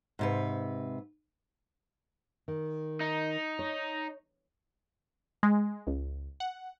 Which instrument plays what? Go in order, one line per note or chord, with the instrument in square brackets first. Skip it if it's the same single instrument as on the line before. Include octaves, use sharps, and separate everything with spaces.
[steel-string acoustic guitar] G#2 C3 B4
[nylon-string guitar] D#3
[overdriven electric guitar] D#4
[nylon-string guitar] C#5
[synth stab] G#3
C#2
F#5